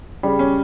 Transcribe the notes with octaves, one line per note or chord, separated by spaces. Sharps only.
C#3 G3
C#4